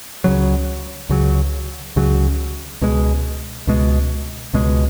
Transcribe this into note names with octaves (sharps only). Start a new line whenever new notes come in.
C#2 C#3 F#3
C#2 C#3 F#3
C#2 C#3 F#3
C#2 B2 G#3
C#2 B2 G#3
C#2 B2 G#3